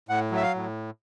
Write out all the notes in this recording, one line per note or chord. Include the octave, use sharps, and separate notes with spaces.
A2 F#5
F#3
E5
F5
A2